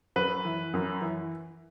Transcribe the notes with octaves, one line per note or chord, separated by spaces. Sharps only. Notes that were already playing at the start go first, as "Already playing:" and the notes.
F#2 B4
E3
F#2
E3